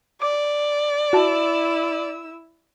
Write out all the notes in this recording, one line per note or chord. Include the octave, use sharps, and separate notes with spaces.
D5 D6
E4 F#4 A5 E6